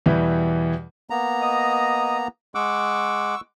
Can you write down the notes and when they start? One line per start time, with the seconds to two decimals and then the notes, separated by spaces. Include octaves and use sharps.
0.06 E2 B2 E3 G3 E4
1.10 A#3 B3 A#5
1.41 D#5
2.55 G#3 F#5 C#6 D6 E6